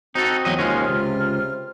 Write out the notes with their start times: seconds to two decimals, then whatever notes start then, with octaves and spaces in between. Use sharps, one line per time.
0.15 C4 D#4 F#4 A4
0.45 E2 F#3 D#5
0.59 D#2 C3 G#3 C#4 F4 F6
0.89 C#2